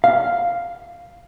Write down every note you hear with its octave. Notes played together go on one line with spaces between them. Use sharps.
F5